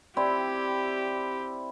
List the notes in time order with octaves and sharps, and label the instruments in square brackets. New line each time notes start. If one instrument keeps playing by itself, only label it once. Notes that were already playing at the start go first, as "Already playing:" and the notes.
[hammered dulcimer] C4 E4 D5 [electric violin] G4